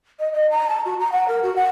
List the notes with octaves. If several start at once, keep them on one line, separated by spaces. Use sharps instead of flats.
D#5
D#5
A#5
A5
F#4
A#5
F#5
A#4
F#4
F#5